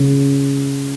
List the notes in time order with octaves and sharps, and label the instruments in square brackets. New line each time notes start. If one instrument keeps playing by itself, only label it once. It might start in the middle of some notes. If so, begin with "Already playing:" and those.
Already playing: [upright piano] C#3